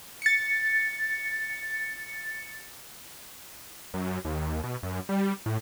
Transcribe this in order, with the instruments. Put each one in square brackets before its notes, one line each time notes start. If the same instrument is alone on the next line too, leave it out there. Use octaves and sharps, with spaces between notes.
[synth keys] A6 C#7
[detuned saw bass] F#2
D#2
B2
F#2
G3
A2